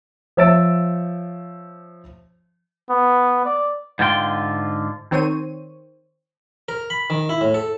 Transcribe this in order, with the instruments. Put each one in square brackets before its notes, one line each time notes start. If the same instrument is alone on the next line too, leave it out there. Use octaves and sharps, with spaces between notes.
[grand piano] F3 C#5 E5 E6 A6 D7
[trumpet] B3
D5
[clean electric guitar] G#2 D3 F4 G5 C6
[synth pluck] D#3 C4 C5 C#5 D#7
[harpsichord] A#4
B5
D#3
E4
A2
A4